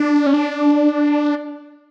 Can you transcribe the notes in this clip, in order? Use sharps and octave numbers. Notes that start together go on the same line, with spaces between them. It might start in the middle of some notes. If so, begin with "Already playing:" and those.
Already playing: D4
C#4
D4